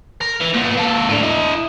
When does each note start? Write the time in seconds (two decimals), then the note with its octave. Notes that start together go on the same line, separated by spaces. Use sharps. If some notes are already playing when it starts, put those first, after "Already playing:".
0.21 A#4
0.41 E3
0.54 A#2 B3
0.77 A#3 A4
1.09 A2 D3
1.22 E4 D#5